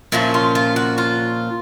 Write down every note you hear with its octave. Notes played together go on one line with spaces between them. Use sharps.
A#2 F3 A#3 C#4 E4
F4
F4
F#4
F4